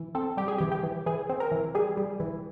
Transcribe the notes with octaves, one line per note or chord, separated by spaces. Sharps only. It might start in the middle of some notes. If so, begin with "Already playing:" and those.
Already playing: E3
C4 A4
G3 G4
G#4
E3 G4
G4
E3
E3 G#4
C4
A#4
E3
G3 G#4
G3
E3